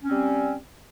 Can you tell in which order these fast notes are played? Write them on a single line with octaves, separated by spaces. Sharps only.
C#4 C4 G3